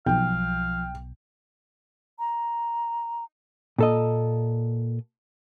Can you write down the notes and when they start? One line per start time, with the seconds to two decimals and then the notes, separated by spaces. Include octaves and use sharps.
0.06 B1 F3 F5 G5
2.19 A#5
3.78 A#2 A4 D#5